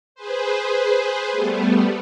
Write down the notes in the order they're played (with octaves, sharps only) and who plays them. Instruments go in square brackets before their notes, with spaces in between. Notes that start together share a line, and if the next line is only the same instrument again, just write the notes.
[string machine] G#4 B4 C5
G3 A3 B3